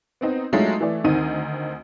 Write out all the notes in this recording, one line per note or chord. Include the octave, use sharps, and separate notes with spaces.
B3 C4 D#4
F#3 G#3 A3 D4 D#4 F4
E3 A3 D5
D2 D#3 C4 D#4 D#7